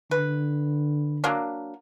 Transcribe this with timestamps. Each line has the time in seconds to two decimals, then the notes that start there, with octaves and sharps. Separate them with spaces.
0.11 D3 B4
1.24 F#3 A#3 D4